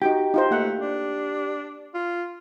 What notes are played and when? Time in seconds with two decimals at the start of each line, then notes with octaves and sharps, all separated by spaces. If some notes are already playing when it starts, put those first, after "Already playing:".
0.02 D#4 F#4 G4 G5
0.34 D#4 F4 C5
0.51 A3 A#3 F#5
0.78 D4
1.94 F4